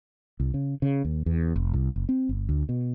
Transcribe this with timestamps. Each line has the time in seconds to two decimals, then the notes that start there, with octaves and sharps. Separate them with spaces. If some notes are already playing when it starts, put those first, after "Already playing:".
0.40 C2
0.54 C#3
0.82 C#3
1.04 D#2
1.26 E2
1.56 F1
1.73 C2
1.96 F#1
2.09 C4
2.29 G1
2.49 D2
2.69 B2